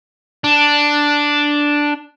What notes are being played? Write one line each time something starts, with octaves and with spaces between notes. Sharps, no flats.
D4